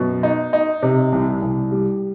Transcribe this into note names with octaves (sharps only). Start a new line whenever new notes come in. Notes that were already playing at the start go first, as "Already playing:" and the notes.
Already playing: F#2 B2
D#4
D#4
C3
C2
C2
G3